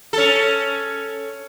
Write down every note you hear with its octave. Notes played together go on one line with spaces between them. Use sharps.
C#4 A4